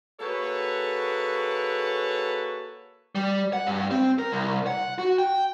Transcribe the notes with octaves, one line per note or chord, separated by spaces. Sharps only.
A#3 F#4 G#4 A4 B4 C#5
G3
F#5
G2
C4
A#4
C2
F#5
F#4
G5